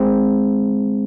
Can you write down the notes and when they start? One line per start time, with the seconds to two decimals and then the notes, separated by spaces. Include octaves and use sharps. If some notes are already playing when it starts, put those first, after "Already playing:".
Already playing: G#3 C4